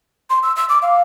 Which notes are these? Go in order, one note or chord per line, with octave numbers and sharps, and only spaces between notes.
C6
E6
E6
D6
F5